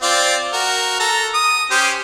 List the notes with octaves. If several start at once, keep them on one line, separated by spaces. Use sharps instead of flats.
C4 F4 D5
F#4 A#4
A4 A#5
D#6
C#4 G4 C5